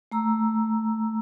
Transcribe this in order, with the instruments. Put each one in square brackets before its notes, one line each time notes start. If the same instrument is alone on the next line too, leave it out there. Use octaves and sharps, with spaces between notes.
[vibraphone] A3 A#5 E6